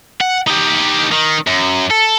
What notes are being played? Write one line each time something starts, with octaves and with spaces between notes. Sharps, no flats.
F#5
D#4 G4
D#3
F#2
A4